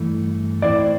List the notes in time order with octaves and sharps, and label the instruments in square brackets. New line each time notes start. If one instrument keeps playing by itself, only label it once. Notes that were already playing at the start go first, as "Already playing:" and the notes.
Already playing: [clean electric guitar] G2 E3 A3
[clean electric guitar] A2 E3 C4 E4 [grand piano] D5